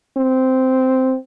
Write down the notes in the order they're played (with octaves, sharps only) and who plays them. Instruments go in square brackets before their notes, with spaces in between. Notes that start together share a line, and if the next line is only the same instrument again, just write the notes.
[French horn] C4